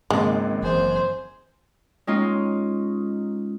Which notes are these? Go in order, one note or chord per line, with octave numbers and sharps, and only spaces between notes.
G#1 C#2 G#2 G#3 A#3
F#1 E3 F#3 G#4 C5
G#3 C#4 D#4 F4